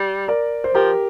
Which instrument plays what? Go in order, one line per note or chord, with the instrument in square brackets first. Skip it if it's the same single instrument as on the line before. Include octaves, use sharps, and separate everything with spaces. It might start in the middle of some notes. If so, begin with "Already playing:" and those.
Already playing: [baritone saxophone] G3
[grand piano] A#4 D5
C5
[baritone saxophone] F3 [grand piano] G4 A#4